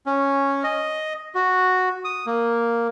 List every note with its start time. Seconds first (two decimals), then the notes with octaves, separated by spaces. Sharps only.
0.06 C#4
0.64 D#5
1.35 F#4
2.04 D#6
2.26 A#3